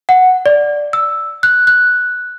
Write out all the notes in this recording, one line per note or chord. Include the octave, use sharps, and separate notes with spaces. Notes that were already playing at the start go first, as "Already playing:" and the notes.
F#5
D5
E6
F#6
F#6